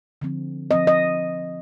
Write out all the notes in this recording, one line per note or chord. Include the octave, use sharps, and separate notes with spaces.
D3 F3 C4
D3 F3 C4 D#5
D#5